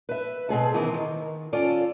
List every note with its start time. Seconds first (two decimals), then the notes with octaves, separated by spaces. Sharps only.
0.09 B4 E5
0.49 B2 C4 G#4 A4
0.74 D#3 E3 B3 C4 E4
0.94 D#3
1.53 C#4 F4 A4 D5